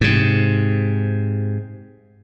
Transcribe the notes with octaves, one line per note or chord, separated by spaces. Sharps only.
G#2 C3